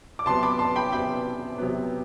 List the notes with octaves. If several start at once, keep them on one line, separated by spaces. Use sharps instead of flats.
D6
C3 F#3 B3 A5 C6
B5 D6
A5 C6
G5 B5
C3 F#3 B3 G5 B5
C3 F#3 B3